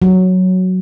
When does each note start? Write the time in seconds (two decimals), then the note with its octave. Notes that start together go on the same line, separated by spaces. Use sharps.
0.02 F#3